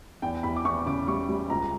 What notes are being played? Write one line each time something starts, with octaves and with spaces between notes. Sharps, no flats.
E2 G5
E2 B5
D6
E2 C#6
C#3 D6
G3 C#6
G3
C#2 A#5